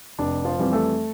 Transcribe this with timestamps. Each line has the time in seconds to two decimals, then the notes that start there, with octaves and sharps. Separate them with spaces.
0.19 F1 D4
0.45 F3 F4
0.59 F2 E3 G3
0.72 A3 A4